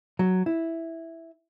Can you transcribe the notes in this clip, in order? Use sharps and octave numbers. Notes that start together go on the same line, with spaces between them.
F#3
E4